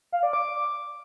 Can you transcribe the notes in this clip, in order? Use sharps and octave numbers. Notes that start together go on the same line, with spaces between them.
F5
D5
D6